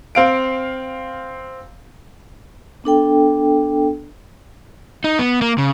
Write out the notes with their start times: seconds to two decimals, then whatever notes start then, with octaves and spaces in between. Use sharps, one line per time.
0.15 C4 F5 D7
2.84 B3 D4 A4 G5
5.04 D#4
5.19 B3
5.42 A#3
5.58 C#3